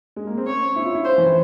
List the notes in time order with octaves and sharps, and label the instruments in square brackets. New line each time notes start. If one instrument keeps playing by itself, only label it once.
[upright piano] G#3
A#3
C4
[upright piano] C#4 [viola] C#5
[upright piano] E4
F4
E4
[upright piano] C#4 [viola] C5
[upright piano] E3